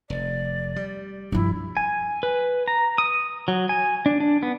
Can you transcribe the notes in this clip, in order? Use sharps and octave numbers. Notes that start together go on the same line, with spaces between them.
F1 D5
G3
G2 F3 E4
G#5
B4
A#5
D#6
F#3
G#5
D4
D4
B3